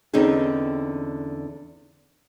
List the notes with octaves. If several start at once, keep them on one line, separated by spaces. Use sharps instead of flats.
E2 D3 C4 C#4 D#4 G#4